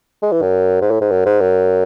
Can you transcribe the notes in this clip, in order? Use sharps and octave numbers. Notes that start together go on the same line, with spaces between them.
G#3
E3
F#2
G#2
A2
G#2
F#2
G#2
F#2